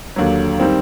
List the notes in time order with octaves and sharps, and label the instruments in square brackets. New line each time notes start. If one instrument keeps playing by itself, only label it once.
[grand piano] D#2 D3 F#3
D#3 G3 C4